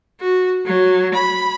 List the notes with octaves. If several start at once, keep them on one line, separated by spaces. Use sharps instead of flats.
F#4
F#3
B5